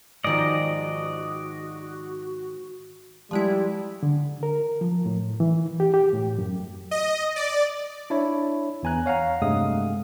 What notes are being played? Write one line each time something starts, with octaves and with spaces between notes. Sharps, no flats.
G#2 D#3 F3 F#4 D5 D#5
F3 G3 G#3 E4
D3
A#4
F3
A2
E3
G4
G4
A2
F#2
D#5
D5
D4 E4 C#5
E2 E3 G#5 A#5 F#6
C#5 F5 F#5 A#5
G2 C3 G#3 A3 F5 D#6